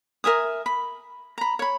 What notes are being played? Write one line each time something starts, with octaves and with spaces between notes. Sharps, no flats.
A#4 E5 G#5 D#6
B5
A#5 B5
C#5 B5